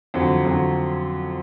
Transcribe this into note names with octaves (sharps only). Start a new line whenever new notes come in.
F2 D3 F#3
F2 D3 F#3